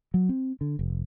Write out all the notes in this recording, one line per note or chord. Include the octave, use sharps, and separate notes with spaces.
F#3
C4
D3
F1